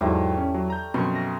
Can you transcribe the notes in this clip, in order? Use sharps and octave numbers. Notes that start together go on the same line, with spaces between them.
E2 G#2 F#3 G3 A3 E4
C#4
F#3
A#5 G6
F#2 B2 F3 C4 C6 C#6
A#6